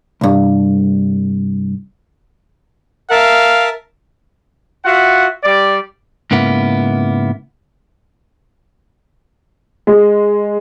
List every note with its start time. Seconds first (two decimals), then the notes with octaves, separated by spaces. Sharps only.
0.21 C2 G2
3.11 A#4 E5 F5 A5
4.85 F4 F#4 E5 F#5
5.44 G3 D5
6.31 G#2 C#3 A#3 B3 E4
9.87 G#3